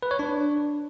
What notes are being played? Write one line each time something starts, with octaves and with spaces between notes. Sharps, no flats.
B4
C#5
D4